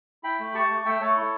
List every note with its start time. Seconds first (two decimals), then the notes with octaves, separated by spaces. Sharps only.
0.24 E4 G5 B5
0.40 A3
0.54 G4 A5 C#6
0.70 A3
0.85 A3 E5 G5
1.01 A3 A4 C#5
1.16 E4